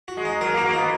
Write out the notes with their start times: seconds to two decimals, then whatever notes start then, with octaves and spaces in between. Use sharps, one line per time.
0.08 F#4
0.17 G#3
0.25 D#4
0.41 F#3 A#4
0.54 A#3
0.57 F#4
0.65 A#3
0.73 B3 D#4